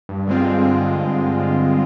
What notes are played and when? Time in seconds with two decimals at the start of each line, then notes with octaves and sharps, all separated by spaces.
0.09 G2
0.27 D3 G#3 C4 F4
0.45 G2
0.64 D3 G#3 C4 F4
0.83 G2